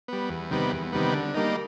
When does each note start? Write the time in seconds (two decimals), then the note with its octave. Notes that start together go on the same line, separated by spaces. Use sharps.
0.08 G3 B3
0.29 E2
0.51 C3 D#3 G3 B3
0.72 E2
0.93 C3 D#3 G3 B3
1.13 D3
1.35 G3 A#3 D#4